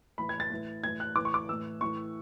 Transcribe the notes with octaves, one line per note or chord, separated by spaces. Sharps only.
A2 E3 B5
G#6
A6
A2 E3
A2 E3 G#6
F#6
A2 E3 D6
C#6
D6
A2 E3 E6
A2 E3 C#6